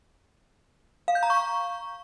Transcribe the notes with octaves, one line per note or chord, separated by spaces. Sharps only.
F5
G6
A#5
C#6